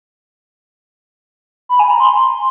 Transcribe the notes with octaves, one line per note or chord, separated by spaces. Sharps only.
B5
G#5
A#5
C6